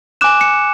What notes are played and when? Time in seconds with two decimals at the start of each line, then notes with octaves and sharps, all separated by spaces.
0.21 G#5 D6 F#6 E7
0.41 C#7